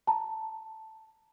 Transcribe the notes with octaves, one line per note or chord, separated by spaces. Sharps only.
A5 A#5